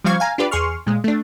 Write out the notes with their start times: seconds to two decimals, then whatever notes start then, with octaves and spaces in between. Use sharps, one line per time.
0.04 F3 G3 C4 F5 C#6 G#6
0.20 F5 G#5 A#5
0.38 D4 F4 G4 B4 D5
0.51 E2 G#4 C6 C#6 F6
0.87 A#2 G#3
1.04 A3 D4